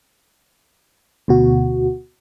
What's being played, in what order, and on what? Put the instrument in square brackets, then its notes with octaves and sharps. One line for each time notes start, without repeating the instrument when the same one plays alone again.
[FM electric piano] D2 B2 F#4